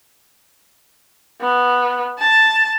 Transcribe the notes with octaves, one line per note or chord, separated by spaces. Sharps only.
B3
A5